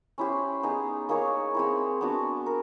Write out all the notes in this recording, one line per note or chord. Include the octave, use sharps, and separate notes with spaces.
C#4 E4 G4 C5
B3 D#4 G#4
A#3 D#4 G#4 C#5
G#3 C4 E4
B3 D4 F#4
A#4